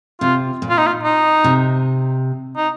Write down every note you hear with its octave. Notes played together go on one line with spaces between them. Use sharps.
C3 F4
A#2
F4
D#4
F4
D#4
C3
D#4